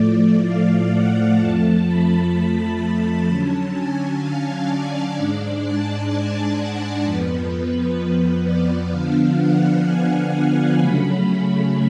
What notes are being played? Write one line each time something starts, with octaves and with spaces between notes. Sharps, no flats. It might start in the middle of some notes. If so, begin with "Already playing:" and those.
Already playing: A2 F3 A3 D5
F5
F#5
F2 F3 A3 A5
B5
D3 F#3 C#4 A5
G#5
F5
D5
G#2 G#3 D4 D5
A5
G#5
F#5
F2 F3 B3 B4
B4
D5
D3 F3 B3 D4 F5
F#5
G#5
C#3 F#3 A3 C#4 B5